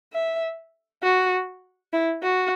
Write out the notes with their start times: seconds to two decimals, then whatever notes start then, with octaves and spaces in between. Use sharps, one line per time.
0.13 E5
1.03 F#4
1.93 E4
2.23 F#4